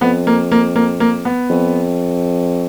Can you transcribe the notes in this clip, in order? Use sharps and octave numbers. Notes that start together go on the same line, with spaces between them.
F2 B3
A#3
A#3
A#3
A#3
B3
F2